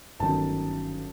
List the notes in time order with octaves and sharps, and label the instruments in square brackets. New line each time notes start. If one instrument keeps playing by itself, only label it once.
[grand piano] G1 F#2 D#3 F#3 A5